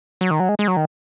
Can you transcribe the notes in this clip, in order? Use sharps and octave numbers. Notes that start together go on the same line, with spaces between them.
F#3
D#3
F#3
G#3
G#3
F#3
D#3